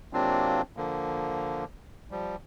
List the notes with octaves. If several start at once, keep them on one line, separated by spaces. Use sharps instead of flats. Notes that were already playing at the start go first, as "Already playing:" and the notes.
C3 F#3 A#3 C4 D4 F4
D3 F3 A#3
F3 G3